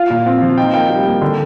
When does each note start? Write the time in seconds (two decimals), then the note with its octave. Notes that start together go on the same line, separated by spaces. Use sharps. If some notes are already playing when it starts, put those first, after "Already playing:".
Already playing: F4 F5
0.10 A#2
0.26 C4
0.42 F3
0.58 D#4 G5
0.74 A#3 G5
0.90 G3
1.05 A#3
1.22 D3